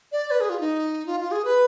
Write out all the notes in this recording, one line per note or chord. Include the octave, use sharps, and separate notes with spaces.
D5
B4
G#4
F4
D#4
F4
F4
G#4
B4